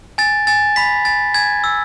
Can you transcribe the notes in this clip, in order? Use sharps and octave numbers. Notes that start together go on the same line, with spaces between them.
G#5 A6
G#5 A6
B5 B6
G#5 A6
G#5 G#6
E6